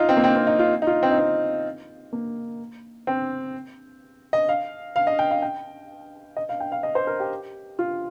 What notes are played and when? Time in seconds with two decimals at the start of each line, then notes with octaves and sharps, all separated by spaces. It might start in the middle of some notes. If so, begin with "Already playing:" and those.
Already playing: D#4 F4
0.09 C4
0.17 A#3
0.24 C4
0.36 C4
0.47 D#4
0.59 F4
0.82 D#4
0.87 F4
1.03 C4
1.11 D#4
1.18 C4
2.13 A#3
3.07 C4
4.33 D#5
4.49 F5
4.96 F5
5.07 D#5
5.19 G5
5.31 F5
5.42 G5
6.37 D#5
6.49 F5
6.60 G5
6.72 F5
6.83 D#5
6.95 C5
7.07 A#4
7.20 G4
7.79 F4